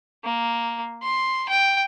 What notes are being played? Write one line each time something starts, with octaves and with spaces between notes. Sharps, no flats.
A#3
C6
G5